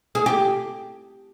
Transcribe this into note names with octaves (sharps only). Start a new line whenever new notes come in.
G#4
G4